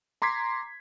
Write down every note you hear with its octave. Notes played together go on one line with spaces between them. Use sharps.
A#5 C6 D6 G#6 B6 C7